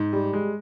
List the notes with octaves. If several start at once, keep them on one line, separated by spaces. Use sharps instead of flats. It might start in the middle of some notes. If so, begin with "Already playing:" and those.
Already playing: G#2
G3
G#3